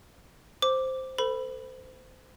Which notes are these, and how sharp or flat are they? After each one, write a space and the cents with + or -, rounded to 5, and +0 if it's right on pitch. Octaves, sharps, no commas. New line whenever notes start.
C5 +0 D6 +0
A4 +30 C5 -30 B5 +0